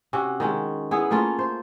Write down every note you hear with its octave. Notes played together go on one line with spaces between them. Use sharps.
C3 C#4 F#4
D#3 G#3 C#4
B3 E4 G#4
A3 A#3 C#4 F4
C5